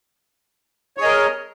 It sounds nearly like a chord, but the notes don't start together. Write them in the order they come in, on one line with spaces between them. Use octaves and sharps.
C#5 G#4 D#5 A#4